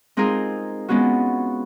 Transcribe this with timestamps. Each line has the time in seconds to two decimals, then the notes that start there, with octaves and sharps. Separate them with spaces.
0.17 G#3 C4 D#4 F4 G#4 A#4
0.89 G#3 B3 C#4 F4 F#4